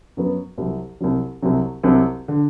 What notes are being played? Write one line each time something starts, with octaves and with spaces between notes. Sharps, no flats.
F#2 F#3 B3
C2 C3 F#3
C2 C3 F#3
C2 C3 F#3
C2 C3 F#3
D3